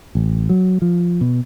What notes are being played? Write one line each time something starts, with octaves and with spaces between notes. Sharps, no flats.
A1
F#3
F3
B2